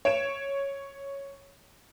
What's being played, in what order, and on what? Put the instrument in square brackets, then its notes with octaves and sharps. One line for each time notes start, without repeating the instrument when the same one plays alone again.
[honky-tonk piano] C#5 D7 E7